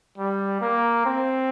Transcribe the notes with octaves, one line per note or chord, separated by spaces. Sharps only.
G3
A#3
C4